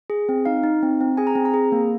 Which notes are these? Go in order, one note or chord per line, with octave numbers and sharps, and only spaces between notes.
G#4
C4
D#4 F5
D#4
C4
C4
G#4 G#5
A#5
C4
A#5
G#4
A#3